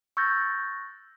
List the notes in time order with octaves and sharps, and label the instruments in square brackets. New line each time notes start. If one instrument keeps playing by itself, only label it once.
[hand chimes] C#6 E6 F#6 G6 A6 A#6